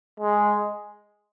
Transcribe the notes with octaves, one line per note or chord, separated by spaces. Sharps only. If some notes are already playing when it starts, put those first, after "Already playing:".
G#3